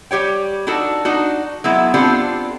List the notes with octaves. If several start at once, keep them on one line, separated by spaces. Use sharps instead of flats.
G3 G4 C#5 G5
D4 D#4 F#4 A4
D4 D#4 F#4
F#3 G#3 B3 E4
B3 C4 D4 F4 G4 A4